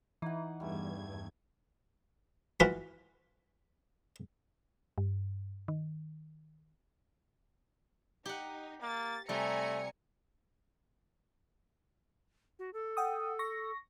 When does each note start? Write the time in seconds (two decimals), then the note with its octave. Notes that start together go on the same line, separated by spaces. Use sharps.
0.22 E3 D#4 F#5
0.60 E2 G2 G3 A3 G#6
2.60 E3 F4 F#4 B5
4.98 G2
5.68 D#3
8.25 D#4 G4 F#5
8.82 A#3 A6
9.29 C3 G3 A3 G#5 A#5 C#7
12.59 F#4
12.73 A4
12.97 F#5 G5 D#6
13.39 C#6 A#6